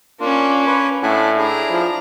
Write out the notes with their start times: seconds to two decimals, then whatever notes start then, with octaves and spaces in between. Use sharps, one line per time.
0.20 A#3 C#4 D4 F4
0.67 B4 C#5
1.03 A2 D4 E5 F#5 G#5
1.38 D4 E4 G#4 A#5
1.70 F3